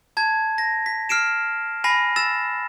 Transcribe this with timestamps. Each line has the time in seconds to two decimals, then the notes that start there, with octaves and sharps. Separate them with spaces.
0.17 A5 G#6
0.58 A#6
0.86 B6
1.09 F6 C7 D7 E7
1.84 G#5 B5 A#6 C7
2.16 E6 A6 E7